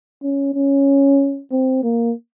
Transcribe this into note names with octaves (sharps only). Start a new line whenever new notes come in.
C#4
C#4
C4
A#3